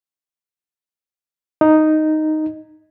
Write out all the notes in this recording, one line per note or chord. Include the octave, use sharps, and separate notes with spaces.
D#4